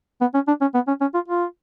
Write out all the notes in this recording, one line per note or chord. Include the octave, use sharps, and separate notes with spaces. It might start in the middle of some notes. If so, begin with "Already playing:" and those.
B3
C#4
D4
C#4
B3
C#4
C#4
F4
F4